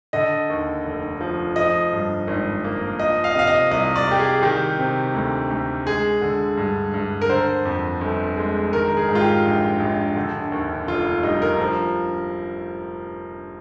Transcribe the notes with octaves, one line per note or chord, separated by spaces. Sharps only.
D3 D#5
D#2
F1
F3
F3 D#5
G2
G#1
A#3
F3 D#5
F5
D#5
C3 F5
D#5
C2 D#5
D5
C2 G4
G#4
D#3 G4
C3
D2
D2
G#3 G#4
D3
G2
G2
A#4
D3 C5
F2
G1
G#3
D#3 A#4
G#4
G#2
F4
G4
A#1
A#1
D3
D#2
F1 F4
G3 D#4
A#4
F3